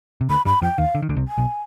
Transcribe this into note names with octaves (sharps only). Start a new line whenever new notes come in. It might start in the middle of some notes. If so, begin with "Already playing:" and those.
C3
D2 D3 B5
G2 G3 B5
F2 F3 G5
D#2 D#3 F5
D3
D#3
D2 D3
C2 C3
G#5
B1 B2